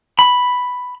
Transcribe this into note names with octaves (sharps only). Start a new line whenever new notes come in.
B5